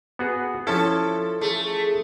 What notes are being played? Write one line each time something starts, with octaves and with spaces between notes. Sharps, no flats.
B3 F#4 G#4
F3 C#4 E4 A4
A3 G#4